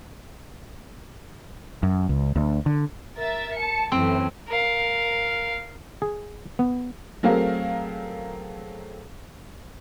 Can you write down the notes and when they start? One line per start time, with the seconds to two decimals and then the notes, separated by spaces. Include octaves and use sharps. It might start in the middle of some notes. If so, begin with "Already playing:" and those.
1.83 F#2
2.09 C#2
2.36 D2
2.66 D3
3.16 A#4 E5 A6
3.56 A5 C#7
3.92 F#2 A2 E3 C4
4.48 A#4 F5
6.02 G#4
6.59 B3
7.23 F#3 A3 C4 G#4 A#4 F5